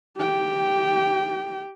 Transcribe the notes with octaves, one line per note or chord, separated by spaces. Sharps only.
G4 G5